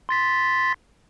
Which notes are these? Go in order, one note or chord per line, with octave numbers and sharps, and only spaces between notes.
C6 A6 B6